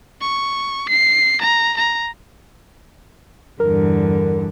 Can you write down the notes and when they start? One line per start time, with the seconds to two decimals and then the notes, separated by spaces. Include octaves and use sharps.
0.21 C#6
0.89 C7
1.42 A#5
1.77 A#5
3.60 E2 G2 D3 A#4